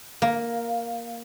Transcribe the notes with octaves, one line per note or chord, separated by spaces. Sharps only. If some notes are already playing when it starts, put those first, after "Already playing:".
A#3